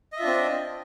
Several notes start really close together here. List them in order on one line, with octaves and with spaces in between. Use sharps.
D#5 E5 F4 D4 C4